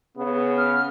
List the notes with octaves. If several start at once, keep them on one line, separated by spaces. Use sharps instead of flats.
C#3 B3
F6